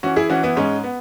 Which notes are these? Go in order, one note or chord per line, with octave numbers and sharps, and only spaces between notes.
E3 C#4 F#4
E4 G#4
E3 C#4 F#4
B3 E4
G#2 G#3 C#4
B3